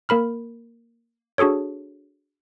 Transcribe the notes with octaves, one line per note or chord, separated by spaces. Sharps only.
A#3 A#4 B5 F6
D4 F#4 G#4 A4 C#5